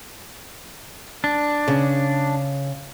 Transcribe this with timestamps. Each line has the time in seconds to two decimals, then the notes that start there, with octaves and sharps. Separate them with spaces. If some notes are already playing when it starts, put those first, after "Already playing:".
1.24 D4
1.68 C#3